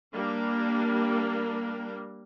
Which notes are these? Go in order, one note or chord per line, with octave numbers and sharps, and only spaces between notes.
G3 A#3 D4 A#4